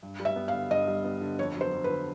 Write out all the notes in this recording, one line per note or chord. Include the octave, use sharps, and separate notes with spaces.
G2
G3
E5
B3
F5
D3
G2 D#5
G3
B3
D3
F2 C#5
F#3 C5
F2
B4
D3